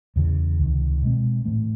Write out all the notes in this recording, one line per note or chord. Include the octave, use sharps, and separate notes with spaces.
E2 C#3 E3
C#2 C3 D#3
B2 G#3 C4
A2 E3 A3